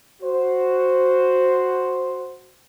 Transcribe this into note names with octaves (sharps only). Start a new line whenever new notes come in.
F#4 C5